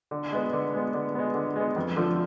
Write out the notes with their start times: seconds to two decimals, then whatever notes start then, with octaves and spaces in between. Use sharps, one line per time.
0.11 D3
0.32 G#3 B3
0.53 D3
0.74 G#3 B3
0.94 D3
1.15 G#3 B3
1.34 D3
1.56 G#3 B3
1.76 F2
1.96 D3 F3 A3